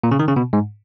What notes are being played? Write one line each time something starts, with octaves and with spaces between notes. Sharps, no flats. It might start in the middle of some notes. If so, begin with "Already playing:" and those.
A#2
C#3
D#3
C#3
B2
G#2